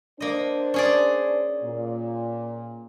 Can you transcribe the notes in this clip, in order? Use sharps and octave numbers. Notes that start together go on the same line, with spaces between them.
A#3 D4 C5 D#5
C#4 G#4 D5
A#2